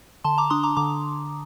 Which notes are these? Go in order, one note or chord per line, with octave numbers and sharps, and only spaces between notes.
D3 A5 C6
A#5 D6
D4 C6 D#6
A#5 D6
D3 A#5 D6